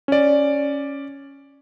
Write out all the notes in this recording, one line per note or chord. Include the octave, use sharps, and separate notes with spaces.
C#4 D5